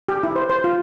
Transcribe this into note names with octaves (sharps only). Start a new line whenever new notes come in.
G4
E4
C5
C5
F4